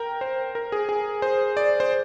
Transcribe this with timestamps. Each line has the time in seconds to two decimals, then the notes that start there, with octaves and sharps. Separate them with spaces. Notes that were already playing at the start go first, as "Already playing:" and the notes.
Already playing: A#4 G5 A#5
0.21 C5
0.55 A#4
0.72 G#4
0.89 G#4
1.22 C5
1.57 D5
1.80 C5